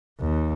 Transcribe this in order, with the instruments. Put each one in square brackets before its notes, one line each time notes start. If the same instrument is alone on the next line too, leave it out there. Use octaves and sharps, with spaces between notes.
[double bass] D#2